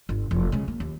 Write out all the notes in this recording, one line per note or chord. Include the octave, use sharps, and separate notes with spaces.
G1
F1 F3
C#3 G#3
A#3
D#2